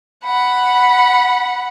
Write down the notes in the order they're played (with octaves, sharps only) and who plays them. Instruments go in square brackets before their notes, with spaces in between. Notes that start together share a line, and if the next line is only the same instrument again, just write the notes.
[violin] F#5 B5